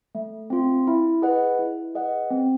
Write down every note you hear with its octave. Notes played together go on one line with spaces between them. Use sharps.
A3
C4 F4
E4
G#4 B4 D#5 F#5
E4
G#4 B4 D#5 F#5
C4